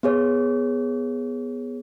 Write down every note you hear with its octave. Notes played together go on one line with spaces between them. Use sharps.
B3 G#4 C#5